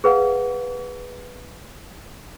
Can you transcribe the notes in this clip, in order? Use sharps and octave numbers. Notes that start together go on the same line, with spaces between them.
G#4 B4 F5 F#5